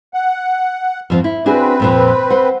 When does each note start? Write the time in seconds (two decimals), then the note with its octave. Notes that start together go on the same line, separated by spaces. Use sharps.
0.14 F#5
1.10 F2 F3 C4
1.24 E4
1.46 C4 D4 F#4 G#4 B4
1.80 F2 A#2 F3
2.30 C5 F#5